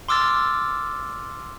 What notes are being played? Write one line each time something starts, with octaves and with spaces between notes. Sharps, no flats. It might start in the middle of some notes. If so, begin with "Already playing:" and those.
C6 D6 E6 F6 A6